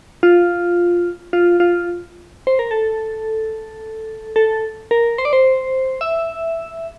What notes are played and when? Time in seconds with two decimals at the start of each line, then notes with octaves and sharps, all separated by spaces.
0.23 F4
1.33 F4
1.60 F4
2.47 C5
2.59 A#4
2.71 A4
4.36 A4
4.91 A#4
5.18 C5
5.25 D5
5.33 C5
6.01 E5